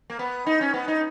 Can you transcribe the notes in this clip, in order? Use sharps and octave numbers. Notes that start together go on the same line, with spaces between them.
A#3
B3
D#4
C#4
B3
D#4